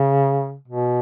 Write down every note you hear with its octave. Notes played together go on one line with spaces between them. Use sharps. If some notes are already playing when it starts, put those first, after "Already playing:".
Already playing: C#3
B2